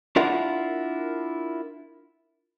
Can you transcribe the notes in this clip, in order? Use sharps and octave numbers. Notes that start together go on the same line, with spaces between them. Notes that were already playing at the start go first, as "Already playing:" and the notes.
D4 E4 F4 A#4 F#5